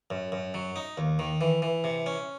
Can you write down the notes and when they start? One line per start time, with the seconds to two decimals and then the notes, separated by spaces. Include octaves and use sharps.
0.10 F#2
0.32 F#2
0.54 F#3
0.76 D#4
0.98 D#2
1.19 D#3
1.41 E3
1.62 E3
1.84 C3
2.06 C#4